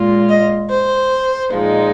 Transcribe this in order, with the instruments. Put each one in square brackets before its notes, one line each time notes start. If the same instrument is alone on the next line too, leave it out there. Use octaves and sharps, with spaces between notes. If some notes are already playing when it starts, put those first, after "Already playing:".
Already playing: [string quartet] A#2 G#3 F4
D#5
C5
A#2 F3 G#3 D#4